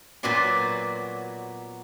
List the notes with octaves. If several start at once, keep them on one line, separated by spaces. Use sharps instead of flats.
A#2 F#3 B3 F#4 D5 C6